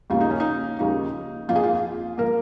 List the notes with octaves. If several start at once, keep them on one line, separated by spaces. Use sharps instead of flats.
D#2 C#3 F3 A#3 F4
D#4
C#4
D#4
D#2 C#3 F3 A#3 D#4
F2 F3 A#3 F4
G#4
F4
F3 A#3 A#4